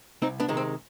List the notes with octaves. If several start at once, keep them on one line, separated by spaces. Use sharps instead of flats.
C2 C4 D#4
B3 D4
C3 D#3 G#3
C4